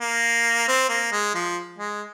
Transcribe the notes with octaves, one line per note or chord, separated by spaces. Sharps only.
A#3
C4
A#3
G#3
F3
G#3